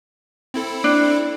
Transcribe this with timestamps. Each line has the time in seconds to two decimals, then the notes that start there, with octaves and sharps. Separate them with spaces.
0.54 C4 E4 A4
0.84 D4